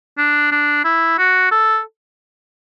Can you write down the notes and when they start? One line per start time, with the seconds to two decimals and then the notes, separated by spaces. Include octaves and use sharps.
0.18 D4
0.52 D4
0.85 E4
1.18 F#4
1.52 A4